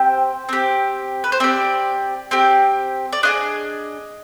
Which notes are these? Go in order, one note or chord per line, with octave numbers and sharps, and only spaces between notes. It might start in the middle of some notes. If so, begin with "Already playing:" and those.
Already playing: C4 G4 C5
C4 G4
B4
C5
C4 G4 D5
C4 G4
D5
D4 F4 G#4 D#5